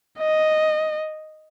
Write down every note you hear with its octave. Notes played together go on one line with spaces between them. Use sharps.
D#5